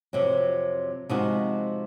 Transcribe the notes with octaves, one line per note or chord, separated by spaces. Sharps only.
F2 C3 F#3
C3 F3 G#3 D#4 F#4